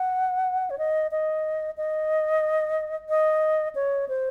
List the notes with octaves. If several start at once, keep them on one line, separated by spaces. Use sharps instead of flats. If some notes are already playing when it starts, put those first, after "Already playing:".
Already playing: F#5
C#5
D#5
D#5
D#5
D#5
C#5
C5